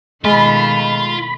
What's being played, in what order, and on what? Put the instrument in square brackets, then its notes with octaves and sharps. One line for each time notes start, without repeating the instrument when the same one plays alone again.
[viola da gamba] B2 D#3 A3 [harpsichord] G#3 [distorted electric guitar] F4 [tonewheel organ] B5